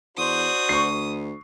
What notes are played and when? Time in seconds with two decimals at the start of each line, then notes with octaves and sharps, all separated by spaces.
0.17 E2 D4 F#4 C5 D#6
0.69 D2 C#6 C7